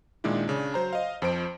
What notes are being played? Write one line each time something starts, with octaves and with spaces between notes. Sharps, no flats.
A#2 D#3 G#3 D4 E4
C#3 D4
F#3 C5 A#5
D#5 F5
F2 F3 C5 D7